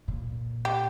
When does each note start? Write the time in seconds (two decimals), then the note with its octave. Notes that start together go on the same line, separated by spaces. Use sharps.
0.08 A#2
0.65 G4